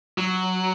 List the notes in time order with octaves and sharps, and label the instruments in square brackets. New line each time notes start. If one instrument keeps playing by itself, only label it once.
[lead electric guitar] F#3